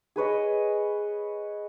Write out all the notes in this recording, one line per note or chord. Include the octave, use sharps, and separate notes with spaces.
G#4 B4 C#5 D#5